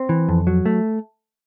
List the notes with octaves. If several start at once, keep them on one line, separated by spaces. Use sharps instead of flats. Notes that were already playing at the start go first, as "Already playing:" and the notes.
Already playing: C4
E3
F2
F#3
A3